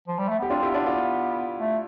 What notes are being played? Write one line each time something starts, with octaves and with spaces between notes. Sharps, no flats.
F3
G3
A3
B3 G4
C4 D4 F4
E4 G4
B3
D4 F4
D4 F4
A3